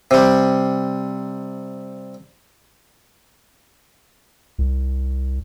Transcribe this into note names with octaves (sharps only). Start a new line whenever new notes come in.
C3 G3
C2